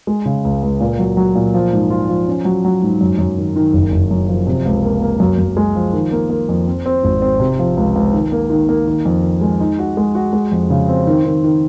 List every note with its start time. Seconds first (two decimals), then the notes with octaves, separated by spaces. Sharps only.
0.07 G#3
0.25 C#3
0.45 C#2
0.63 C#2
0.80 A#2
0.99 F#3
1.17 F#3
1.35 A#2
1.54 F3
1.73 G#2
1.90 F4
2.09 F3
2.28 C#4
2.45 F#3
2.65 F#3
2.82 G#2
3.01 F#2
3.19 F#2
3.38 D#3
3.56 D#3
3.73 F#1
3.92 F#1
4.11 F#2
4.28 F3
4.47 C3
4.66 C#2
4.84 A#3
5.02 A#3
5.20 F#2
5.39 F#2
5.57 G#3
5.75 F3
5.93 D#3
6.12 A#3
6.30 A#3
6.49 F2
6.67 C4
6.86 C4
7.04 G#1
7.22 C4
7.40 C3
7.59 F3
7.77 C#2
7.96 C#2
8.14 D#3
8.32 A#3
8.50 D#3
8.69 A#3
8.87 D#3
9.05 F2
9.23 D#3
9.41 G#3
9.60 D#4
9.79 F#4
9.97 G#3
10.15 F#4
10.33 G#3
10.51 F2
10.70 C#3
10.89 C4
11.07 D#3
11.25 D#3
11.44 D#3